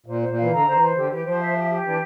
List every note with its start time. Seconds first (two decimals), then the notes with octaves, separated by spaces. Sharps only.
0.06 A#2 C5
0.21 C5
0.29 A#2
0.37 E3 F5
0.51 D3 A#5
0.66 D3 C5
0.73 E3
0.80 C5
0.95 D3 G4
1.10 E3 G4
1.25 F3 C5
1.39 E5
1.55 G4
1.70 G4
1.84 E3 D4